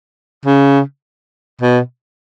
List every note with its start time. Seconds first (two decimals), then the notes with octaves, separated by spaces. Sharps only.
0.46 C#3
1.62 B2